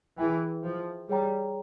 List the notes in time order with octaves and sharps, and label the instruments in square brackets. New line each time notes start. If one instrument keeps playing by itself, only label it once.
[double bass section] E3 [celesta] G#4 E5 G5
[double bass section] F3
[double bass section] G3 [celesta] G#4 C#5 G5 A#5